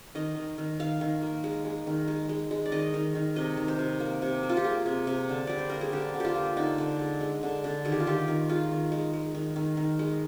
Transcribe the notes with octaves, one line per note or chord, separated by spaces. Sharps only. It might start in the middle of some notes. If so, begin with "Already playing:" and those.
D#3 D#5
D#3
D#3
D#3 F5
D#3
A#3
G#3
G#3
D#3
G#3
G#3
G#3
D5
D#3 D#5
D#3
D#3
C3 D#5
D#3
C5
C3
A#3
C3
A#3
F4
G4
A#3 G#4
C3
C3
D3
G3 D5
C5
A#3 A#4
G#4
D3 G4
D3
F4 G4
A#3
D3 D#4
D3
G#3
G#3
D3
D3
D#3 G#4
G4
F4
D#3 G4
D#3
G#3 F4
D#3
G#3
G#3
D#3
D#3
D#3
G#3